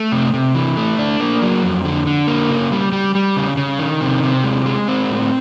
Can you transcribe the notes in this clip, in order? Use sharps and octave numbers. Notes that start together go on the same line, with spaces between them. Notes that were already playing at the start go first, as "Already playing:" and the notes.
Already playing: A3
C3
C3
E3
A3
D4
A#3
F#3
F2
D3
D3
A#3
C#3
G3
G3
G3
C#3
C#3
D#3
C3
C3
G#3
G#3
C4
A2